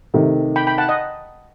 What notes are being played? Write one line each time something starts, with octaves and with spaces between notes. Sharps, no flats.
C3 D#3 A3
G5 B5
G5 B5
F#5 A5
D#5 F#5